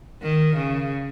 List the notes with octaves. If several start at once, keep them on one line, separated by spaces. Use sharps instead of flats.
D#3
C#3